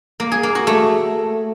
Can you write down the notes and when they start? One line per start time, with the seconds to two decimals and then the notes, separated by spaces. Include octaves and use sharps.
0.20 A#3
0.32 G#4
0.43 A#3
0.55 F#4
0.67 A3